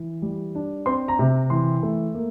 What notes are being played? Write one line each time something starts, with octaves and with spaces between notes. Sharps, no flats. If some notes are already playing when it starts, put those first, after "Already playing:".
Already playing: E3
G3
D4
C4 C6
A#5
C3
E3 C6
A3
A#3